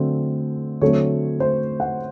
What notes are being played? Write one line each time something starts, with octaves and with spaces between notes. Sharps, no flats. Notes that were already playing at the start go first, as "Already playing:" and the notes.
Already playing: D3 F#3 A3 C4
D3 F#3 A3 C4 C#5
C5
F#5